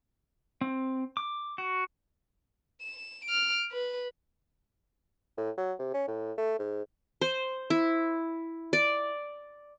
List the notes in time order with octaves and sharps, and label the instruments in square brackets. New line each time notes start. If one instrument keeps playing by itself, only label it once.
[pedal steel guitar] C4
D6
F#4
[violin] E7
F6 D7
B4
[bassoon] A2
F#3
C3
C#4
A2
A3
G#2
[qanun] C5
E4
D5